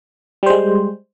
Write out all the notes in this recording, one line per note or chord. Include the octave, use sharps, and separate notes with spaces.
G3 G#3 C5